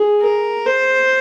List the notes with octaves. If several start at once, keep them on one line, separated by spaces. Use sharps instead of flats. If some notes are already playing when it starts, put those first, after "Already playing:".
Already playing: G#4
A#4
C5